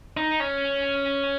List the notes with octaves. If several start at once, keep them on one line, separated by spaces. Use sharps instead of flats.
D#4
C#4